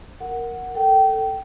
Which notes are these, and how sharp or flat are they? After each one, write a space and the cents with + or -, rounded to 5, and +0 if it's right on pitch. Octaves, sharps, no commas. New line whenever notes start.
A#4 +0 F#5 +0
A4 +10 G5 -25